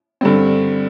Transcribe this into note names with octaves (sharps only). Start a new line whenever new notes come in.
G2 D3 G3 C4